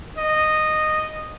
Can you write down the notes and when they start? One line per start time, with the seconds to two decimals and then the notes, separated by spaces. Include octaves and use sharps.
0.17 D#5